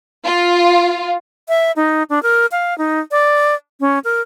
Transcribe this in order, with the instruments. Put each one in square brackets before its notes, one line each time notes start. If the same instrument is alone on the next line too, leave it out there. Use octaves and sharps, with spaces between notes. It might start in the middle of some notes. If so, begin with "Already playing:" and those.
[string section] F4
[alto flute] E5
D#4
D4
A#4
F5
D#4
D5
C#4
A#4